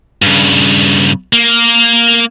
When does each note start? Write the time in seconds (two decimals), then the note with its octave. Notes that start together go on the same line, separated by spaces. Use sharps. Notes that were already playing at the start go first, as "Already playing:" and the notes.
0.22 G2 C#3
1.33 A#3